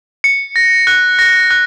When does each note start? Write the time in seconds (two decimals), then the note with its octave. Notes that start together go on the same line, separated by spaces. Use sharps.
0.24 C#7
0.56 A#6
0.87 F#6
1.19 A#6
1.51 F#6